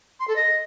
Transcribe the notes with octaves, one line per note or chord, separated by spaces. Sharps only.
C6
A4
D#5